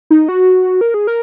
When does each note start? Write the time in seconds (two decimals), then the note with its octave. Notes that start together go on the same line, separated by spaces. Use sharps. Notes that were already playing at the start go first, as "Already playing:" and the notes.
0.10 D#4
0.29 F#4
0.81 A#4
0.94 G#4
1.07 A#4